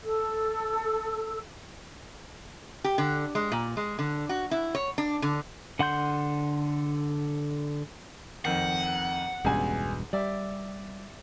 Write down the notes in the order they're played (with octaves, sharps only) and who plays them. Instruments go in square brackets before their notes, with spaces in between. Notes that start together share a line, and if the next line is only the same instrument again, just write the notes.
[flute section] A4 E6
[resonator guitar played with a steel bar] G4
D3
G#3
A#2
G#3
D3
F#4
E4
C#5
D4
D3
[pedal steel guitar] D3 F#5 C6 G6
[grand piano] F2 D#3 [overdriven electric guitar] F#5
[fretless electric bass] E1 G2 B2 [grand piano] C#2 G#5
[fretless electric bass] G3 [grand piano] D5 E5